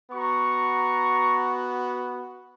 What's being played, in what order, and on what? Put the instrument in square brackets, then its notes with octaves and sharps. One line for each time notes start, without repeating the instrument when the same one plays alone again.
[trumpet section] B3 F#4 A#5 C#6